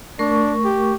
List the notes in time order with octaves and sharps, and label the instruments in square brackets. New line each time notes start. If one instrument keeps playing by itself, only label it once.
[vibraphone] A3 A#4 C#6 [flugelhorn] D4
[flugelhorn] G4